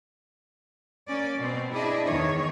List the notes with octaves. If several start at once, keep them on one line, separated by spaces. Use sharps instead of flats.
A#3 C#4 D5
B2 C4
D4 E4 G#4 D5 D#5
E2 D#3 C#5